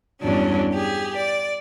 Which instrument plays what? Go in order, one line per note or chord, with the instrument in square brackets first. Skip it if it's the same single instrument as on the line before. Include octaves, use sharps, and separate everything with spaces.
[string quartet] E2 G2 F#3 C#4 D4
G4 G#4
D5